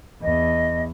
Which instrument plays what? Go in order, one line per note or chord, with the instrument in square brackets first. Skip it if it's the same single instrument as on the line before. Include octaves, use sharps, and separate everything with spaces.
[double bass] E2 [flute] D#5